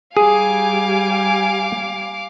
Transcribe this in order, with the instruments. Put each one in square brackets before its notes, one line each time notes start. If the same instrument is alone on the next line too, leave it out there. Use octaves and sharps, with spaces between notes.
[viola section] G3 G4 G#5 [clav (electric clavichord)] G#4 [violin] F5 D6